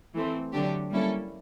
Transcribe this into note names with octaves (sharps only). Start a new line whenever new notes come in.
E3 A3 C4
D3 F#3 A3 D4 G4
G3 A#3 C#4 E4 A4